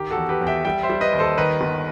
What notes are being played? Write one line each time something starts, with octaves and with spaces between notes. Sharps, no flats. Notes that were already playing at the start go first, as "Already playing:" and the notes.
Already playing: D#3 G4
F#4 A4
E2
G4 B4
E2
E5 G5
G3 E5 G5
C5 E5
G3
B4 D#5
D#2
A4 C5
D#3 B4 D#5
G1